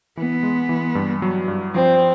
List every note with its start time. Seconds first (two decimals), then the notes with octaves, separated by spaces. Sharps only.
0.17 E3 B3
0.43 G#3
0.69 E3
0.95 G2
1.22 F#3
1.48 G2
1.74 F3 C4